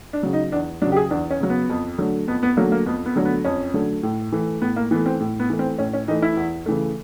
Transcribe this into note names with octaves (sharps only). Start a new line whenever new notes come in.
D4
C#3 F#3
D#4
E2 D4
C#3 F#3 D4
G4
G#4
E2 D4
C#4
C#3 F#3
B3
F2
D3 F#3 A3
F2 B3
B3
D3 F#3 A3 A#3
A#3
F2 B3
B3
D3 F#3 A3
B3
F2 C#4
D3 F#3 A3
A2
E3 A3
A2 B3
A#3
E3 A3 B3
C4
A2
B3
E3 A3
C4
A2 C#4
C#4
E3 A3 D#4
E4
E2
C#3 E3 A3